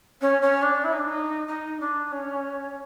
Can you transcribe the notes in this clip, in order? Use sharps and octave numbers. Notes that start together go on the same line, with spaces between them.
C#4
C#4
D4
E4
D#4
D4
D#4
D#4
D4
C#4